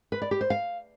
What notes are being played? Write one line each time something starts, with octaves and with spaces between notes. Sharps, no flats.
B4
D5
G4
C5
F5